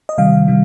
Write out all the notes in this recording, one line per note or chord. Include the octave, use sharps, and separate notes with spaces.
D#5
C3 D#3 G3 F5
C3 D#3 G3